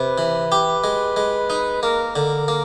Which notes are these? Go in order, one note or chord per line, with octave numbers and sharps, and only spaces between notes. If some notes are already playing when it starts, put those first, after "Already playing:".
Already playing: C3 B4
E3
G4
G#3
G#3
D#4
A#3 A#4
D3 A#4
A#3